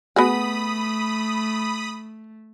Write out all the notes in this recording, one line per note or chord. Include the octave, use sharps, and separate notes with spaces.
A3 B3 F#4 G#4 B5 D#6